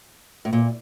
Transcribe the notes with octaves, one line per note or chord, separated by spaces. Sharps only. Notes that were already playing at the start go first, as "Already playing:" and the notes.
A2
A#2